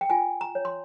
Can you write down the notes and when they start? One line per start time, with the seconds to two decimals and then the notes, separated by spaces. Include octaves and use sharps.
0.01 G5
0.10 F4 G#5
0.41 A#5
0.55 C#5
0.65 C6